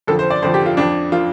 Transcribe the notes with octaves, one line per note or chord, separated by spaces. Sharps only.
F2 D3 F3 A4
C5
D5
F2 D3 F3 C5
G4
F4
F2 F3 D4
F3 F4